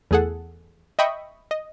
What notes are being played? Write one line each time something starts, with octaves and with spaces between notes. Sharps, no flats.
E2 A3 G#4 A4 F#5
D#5 E5 G5 B5 C#6 D#6
D#5